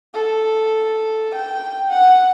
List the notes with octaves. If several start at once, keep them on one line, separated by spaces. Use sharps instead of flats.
A4
G5
F#5